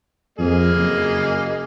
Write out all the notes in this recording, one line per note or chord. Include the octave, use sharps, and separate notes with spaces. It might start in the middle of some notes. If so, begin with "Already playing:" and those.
F2 A#3 G#4 D#5
F#1